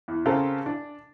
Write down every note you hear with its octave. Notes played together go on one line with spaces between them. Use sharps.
E2
C#3 C4 F4 G4 A4 A#4
D4